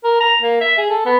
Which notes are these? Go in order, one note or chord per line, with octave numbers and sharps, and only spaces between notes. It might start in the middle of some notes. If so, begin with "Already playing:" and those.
A#4
A#5
A#3
E5
G#4
A4
B3